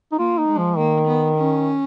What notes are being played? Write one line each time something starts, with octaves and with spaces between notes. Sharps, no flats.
D#4
A#3 F4
D#4
G#3
F3
D#3 A#3
B3
C#4